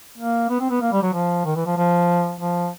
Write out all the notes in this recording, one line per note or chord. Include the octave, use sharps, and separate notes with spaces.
A#3
B3
C4
B3
A#3
G3
F#3
F3
D#3
E3
F3
F3
F3